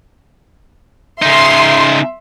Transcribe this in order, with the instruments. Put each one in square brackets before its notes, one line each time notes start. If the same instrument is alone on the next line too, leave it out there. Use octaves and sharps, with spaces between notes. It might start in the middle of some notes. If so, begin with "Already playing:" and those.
[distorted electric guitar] C#3 D#4 [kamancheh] E5 [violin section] C6